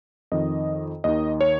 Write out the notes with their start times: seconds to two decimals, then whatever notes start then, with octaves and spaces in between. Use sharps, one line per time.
0.32 F2 D#3 D#5
1.04 D#2 D#3 D#5
1.41 C#5